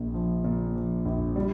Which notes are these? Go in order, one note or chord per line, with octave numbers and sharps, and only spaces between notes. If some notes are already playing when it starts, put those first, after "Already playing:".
Already playing: A#1 A#2
F3
A#2
F3
A#1
G3